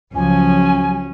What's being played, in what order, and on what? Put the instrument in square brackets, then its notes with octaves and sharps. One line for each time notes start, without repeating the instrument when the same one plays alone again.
[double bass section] C#2 F3 F#3 [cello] C#4 [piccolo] G#5